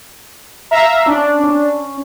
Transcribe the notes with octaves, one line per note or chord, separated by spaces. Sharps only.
E5 F5 A#5
C#4 D4
C#4